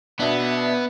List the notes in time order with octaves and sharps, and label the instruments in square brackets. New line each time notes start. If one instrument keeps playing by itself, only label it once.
[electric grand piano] B2 D4 [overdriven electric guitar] B3 [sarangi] E5